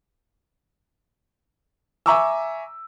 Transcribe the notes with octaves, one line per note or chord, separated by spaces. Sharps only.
E5 G#5 A#5 C#6 D6 E6